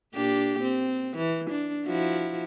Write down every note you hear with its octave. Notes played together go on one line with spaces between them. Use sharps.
A#2 D4 G4
C4
E3
D4
F3 E4 F#4